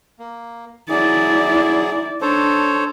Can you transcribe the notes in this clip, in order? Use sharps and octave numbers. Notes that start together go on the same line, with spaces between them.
A#3
F#3 E4 G#4 D5
D4 A4 C5 C#5